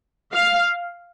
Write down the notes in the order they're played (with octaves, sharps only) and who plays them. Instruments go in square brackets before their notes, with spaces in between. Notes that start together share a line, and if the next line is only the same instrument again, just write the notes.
[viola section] F5